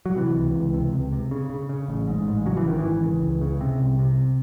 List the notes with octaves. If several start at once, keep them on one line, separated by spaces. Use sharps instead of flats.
F#3
C3 E3
C#2
C#2
C3
C#2
C3
C#3
C#3
C#3
A1
G#2
A1
C#3 F#3
E3
G#1 D#3
E3
G#1
C#3
C#2
C#3
C3
C2
C3